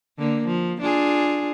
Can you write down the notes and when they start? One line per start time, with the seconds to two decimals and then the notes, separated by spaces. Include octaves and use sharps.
0.19 D3 A#3
0.47 F3
0.81 D4 F4 G#4